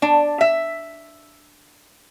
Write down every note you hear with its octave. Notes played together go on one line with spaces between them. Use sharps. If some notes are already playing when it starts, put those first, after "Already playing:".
D4
E5